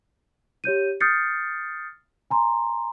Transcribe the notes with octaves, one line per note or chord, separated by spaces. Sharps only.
G4 C#5 G6 D#7
D#6 F6 G6 A6 C7 C#7
G#5 A#5 C6